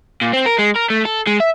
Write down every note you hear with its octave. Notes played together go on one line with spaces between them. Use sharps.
A#2
C4
A#4
G#3
A#4
A3
A4
G#3
E5